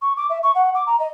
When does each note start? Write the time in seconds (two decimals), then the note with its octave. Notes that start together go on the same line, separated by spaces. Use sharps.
0.01 C#6
0.16 D6
0.29 E5
0.43 C#6
0.55 F#5
0.74 D6
0.86 A#5
0.99 D#5